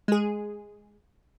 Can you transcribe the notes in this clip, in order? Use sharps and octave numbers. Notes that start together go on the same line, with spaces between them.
G#3 G#4